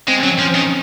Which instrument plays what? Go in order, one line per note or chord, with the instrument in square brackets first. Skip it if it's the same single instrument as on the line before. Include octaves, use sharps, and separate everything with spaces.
[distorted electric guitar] G#3 [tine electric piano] C4
[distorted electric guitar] F#3 [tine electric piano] C#4
[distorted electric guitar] F3
D#3